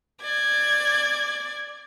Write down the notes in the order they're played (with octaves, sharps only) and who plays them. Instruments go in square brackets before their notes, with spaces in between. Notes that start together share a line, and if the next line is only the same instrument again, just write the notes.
[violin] D5 G#6